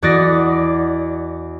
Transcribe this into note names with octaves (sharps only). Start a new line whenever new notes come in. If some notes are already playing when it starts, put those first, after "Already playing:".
E2 F#4 D5 D#5 A6 A#6